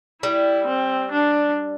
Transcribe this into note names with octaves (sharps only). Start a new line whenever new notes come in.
G3 E4
C4
D4